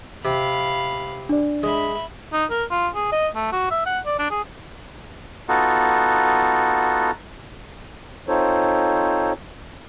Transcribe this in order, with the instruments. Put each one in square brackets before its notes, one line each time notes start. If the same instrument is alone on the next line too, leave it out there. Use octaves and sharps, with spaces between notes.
[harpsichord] C3 [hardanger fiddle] F5 B5
[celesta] D4 D5
[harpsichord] G#3 [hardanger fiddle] E5 B5
[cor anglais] D#4
A#4
F4
G#4
D#5
A3
F#4
E5
F#5
D5
D4
G#4
[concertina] B3 D#4 F4 F#4 A4
[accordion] C4 D#4 F4 A4 C5 C#5